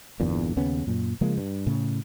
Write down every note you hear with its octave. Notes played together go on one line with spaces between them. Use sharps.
G1 E2 G2 A#2
D#2 C#3 B3 C#4
F#2 A#2
C#3 F3 G#3 A#3
G2
A2 C#3